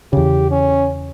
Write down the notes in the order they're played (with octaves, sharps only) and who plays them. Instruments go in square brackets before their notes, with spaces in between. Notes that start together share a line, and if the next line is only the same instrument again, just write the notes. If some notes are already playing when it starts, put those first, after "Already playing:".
[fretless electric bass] E2 C#3 [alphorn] G4
[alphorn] C#4